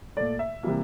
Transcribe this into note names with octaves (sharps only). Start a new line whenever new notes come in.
A#2 A3 D5
E5
C3 E3 G3 A#3